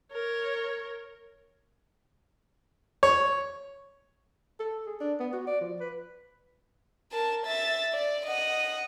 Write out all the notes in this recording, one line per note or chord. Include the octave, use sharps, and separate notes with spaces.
A#4 C#5
C#5
A4
G#4
D4
B3
F#4
D5
F3
B4
A#4 A5
E5 A6
D5
D#5 F#5